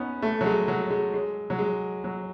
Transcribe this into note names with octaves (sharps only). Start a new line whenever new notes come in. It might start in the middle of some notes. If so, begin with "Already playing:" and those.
Already playing: B3 C#4 D#4
A3
F#3
G#3
F#3
G#3
G#3
F#3
G#3
F#3